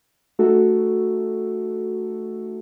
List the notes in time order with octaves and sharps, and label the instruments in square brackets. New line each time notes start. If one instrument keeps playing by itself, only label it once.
[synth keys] A3 D#4 F#4 A4